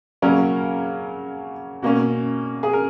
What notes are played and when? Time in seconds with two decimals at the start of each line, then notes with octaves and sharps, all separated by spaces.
0.22 C#3 F#3 A#3 C#4 A#4
1.83 B2 A#3 C#4
2.63 G#4
2.73 A#4